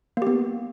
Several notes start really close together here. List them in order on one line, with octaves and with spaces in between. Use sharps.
A#3 G4 B3